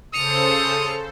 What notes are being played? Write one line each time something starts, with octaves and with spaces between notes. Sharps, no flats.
C#3 A4 C5 D#6 C#7 F7